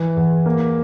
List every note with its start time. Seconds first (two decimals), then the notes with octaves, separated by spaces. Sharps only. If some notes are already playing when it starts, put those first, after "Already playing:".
Already playing: E3
0.16 E2
0.46 A#3